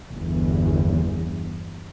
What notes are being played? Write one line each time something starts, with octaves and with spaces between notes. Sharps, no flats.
G1 E2